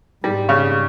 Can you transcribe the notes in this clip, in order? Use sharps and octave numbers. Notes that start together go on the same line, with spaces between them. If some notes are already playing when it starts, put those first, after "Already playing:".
G#2 G3
C#3